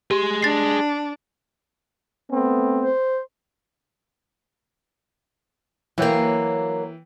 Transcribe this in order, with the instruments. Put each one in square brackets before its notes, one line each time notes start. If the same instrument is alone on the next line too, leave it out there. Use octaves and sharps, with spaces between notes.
[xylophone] G4 [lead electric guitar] G#4 C6
[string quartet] D4 [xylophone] A6 C7
[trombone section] A3 B3 C4
[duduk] C5
[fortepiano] E3 G5 [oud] F#3 A#3